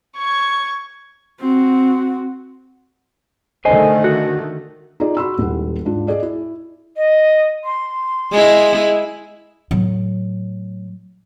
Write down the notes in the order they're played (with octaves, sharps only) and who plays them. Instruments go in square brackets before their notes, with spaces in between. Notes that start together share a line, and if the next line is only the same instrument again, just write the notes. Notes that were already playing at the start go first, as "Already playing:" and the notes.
[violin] C#6 G#6
[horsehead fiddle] C4 F#4
[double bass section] D3 D#3 A3 [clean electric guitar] C5 D#5 G#5
[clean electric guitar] F#4
[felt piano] D#4 F4 G#4 D5
F#4 B5 C6 E6
D#1 D#2 G#3 E4 F#5
G#2 D4 F4
G#4 D5 D#5
E4
[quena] D#5
C6
[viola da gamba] G#3 E4
[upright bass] A2 F#3